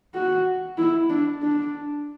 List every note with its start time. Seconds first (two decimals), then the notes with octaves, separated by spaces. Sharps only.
0.14 F#4
0.78 E4
1.09 D4
1.42 D4